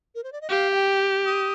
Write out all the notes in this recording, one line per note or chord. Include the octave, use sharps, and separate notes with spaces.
A#4
C5
D5
D#5
G4 F5
F5
G5
D#6